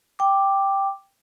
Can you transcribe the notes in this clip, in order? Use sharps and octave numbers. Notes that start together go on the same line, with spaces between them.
G5 D6